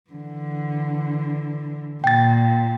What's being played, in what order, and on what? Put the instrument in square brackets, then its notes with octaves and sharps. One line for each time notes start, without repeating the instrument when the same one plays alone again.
[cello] D3 E3
[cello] A#2 [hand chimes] G5 A6